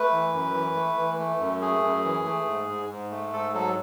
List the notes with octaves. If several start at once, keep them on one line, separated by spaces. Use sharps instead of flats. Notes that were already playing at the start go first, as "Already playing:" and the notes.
Already playing: A3 B4
E3
F#2
E3
A3
E3
A3
F#2
A3 G#4
F#2
E3
A3
G#2
G#2
G#2
A3
G#2 A4
F#3 A4